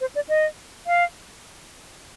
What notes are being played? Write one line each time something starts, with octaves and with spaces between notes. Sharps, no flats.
C5
D5
D#5
F5